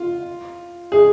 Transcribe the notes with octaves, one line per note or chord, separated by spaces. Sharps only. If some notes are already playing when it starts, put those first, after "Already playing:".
Already playing: F4
G#4